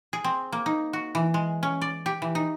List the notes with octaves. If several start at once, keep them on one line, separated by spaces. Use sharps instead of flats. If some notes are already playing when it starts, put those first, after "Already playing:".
G#4
C4
A#3
D#4
F#4
E3
G#3
C#4
D5
G4
E3
D#4